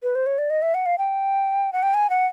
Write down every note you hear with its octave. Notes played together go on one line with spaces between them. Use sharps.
B4
C5
C#5
D5
D#5
E5
F#5
F5
G5
F#5
G5
G#5
F#5